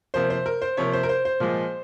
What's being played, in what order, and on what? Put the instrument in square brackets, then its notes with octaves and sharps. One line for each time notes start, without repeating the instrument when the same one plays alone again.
[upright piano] C3 F3 A#3 C5
C5
A#4
C5
C3 F3 A#3 C#5
C5
A#4
C5
C5
A#2 F3 G#3